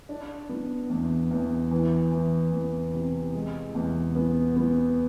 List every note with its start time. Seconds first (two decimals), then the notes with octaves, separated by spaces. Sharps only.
0.09 D4
0.49 B3
0.90 E2
1.31 E2
1.71 E3
2.12 E3
2.52 E2
2.94 C3
3.34 G#3
3.75 E2
4.15 B3
4.57 B3